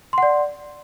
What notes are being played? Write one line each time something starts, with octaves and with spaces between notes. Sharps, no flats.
D5 F#5 C6